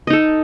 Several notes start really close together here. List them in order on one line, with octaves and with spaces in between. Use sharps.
D#5 D#4 A4